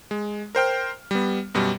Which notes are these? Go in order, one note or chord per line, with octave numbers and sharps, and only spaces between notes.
G#3
A#4 C5 G5 F6
G3 B3
F#2 B2 G3